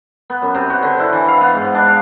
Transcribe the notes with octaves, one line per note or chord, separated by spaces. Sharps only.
B3
F#2
C3
F#4
D3
E4
E3
F5
B3
G#2
D4
F5